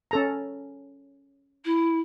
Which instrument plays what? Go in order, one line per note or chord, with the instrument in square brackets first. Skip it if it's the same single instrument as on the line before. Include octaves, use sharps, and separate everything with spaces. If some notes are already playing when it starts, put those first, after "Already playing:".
[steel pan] C#4 A4 A#5
[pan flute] E4